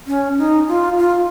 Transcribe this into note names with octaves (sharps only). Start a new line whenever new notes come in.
C#4
D#4
F4
F4